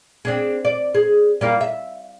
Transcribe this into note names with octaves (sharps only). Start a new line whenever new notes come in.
C4 D4 G#4
D5
G#4
G3 A#3 F4
E5